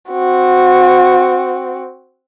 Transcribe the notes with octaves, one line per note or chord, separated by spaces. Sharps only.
C4 F#4